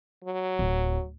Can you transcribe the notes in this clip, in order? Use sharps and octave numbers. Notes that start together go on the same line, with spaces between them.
F#3
D1